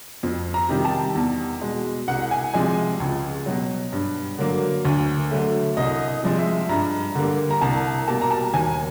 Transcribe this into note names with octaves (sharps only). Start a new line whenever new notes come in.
F2
A#5
C3 D#3 G3
A5
E2
B2 G#3
C2 F#5
G#5
C3 F3 G#3 G#5
C#2
B2 F#3
G2
D3 F#3 A#3
D2
D3 F#3 A3
C2 D#5
D#5
C3 F3 G#3
E5
G2 A#5
D3 G3 A#3
A#5
C2 A5
B2 G3 A#3 A5
A#5
A5
D#2 G#5